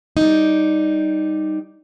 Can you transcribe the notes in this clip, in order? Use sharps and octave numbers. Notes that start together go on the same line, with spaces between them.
G3 D#4